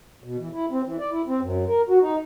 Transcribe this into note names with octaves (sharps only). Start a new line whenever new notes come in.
B2
E3
E4
C4
E3
D5
E4
C4
F#2
A#4
F#4
D#4